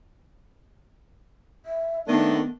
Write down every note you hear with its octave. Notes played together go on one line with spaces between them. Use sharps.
E5
D#3 A3 B3 D4